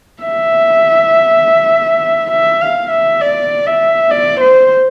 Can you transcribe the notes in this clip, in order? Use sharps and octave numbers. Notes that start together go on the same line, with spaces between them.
E5
E5
F5
E5
D5
E5
D5
C5